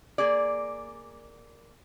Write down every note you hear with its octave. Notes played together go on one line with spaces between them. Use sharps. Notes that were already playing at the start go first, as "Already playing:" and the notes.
A#3 G#4 D5